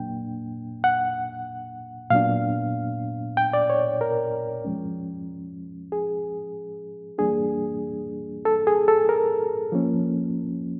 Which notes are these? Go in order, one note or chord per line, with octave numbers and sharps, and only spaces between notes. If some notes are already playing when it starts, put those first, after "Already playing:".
Already playing: A#2 F#3 A#3 D4 G5
F#5
A#2 F#3 B3 D4 F5
G5
D5
C#5
A#4
F3 G#3 C#4
G#4
E3 G3 A#3 D4 G#4
A4
G#4
A4
A#4
F3 A#3 C#4